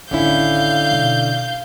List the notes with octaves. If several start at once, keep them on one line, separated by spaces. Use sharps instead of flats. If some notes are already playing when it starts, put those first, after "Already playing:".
A1 D3 D#3 C#4 E4 F5 G6
B2 D#4